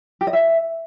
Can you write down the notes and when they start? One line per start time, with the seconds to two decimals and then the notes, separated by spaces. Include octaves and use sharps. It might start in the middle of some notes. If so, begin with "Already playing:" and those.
0.21 G4
0.27 D#5
0.33 E5